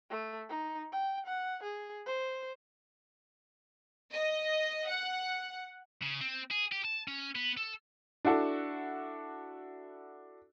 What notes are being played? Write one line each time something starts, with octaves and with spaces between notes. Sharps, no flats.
A3
D#4
G5
F#5
G#4
C5
D#5
F#5
C#3
C4
G#4
G4
A5
C#4
B3
A4
D4 E4 F#4 A4